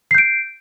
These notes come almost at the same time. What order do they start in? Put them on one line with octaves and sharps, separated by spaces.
C7 G6 D7